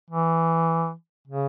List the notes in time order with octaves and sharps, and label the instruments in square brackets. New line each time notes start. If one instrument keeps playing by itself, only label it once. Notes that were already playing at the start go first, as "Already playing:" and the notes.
[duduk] E3
C#3